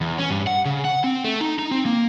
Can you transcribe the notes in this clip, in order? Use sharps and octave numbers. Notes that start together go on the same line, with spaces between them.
E2
C#4
G2
F#5
C#3
F#5
C4
A3
D#4
D#4
C4
A#3